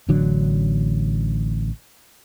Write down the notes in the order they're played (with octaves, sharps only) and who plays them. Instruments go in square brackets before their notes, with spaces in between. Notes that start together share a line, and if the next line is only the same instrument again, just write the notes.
[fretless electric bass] A1 D3 F#3 D4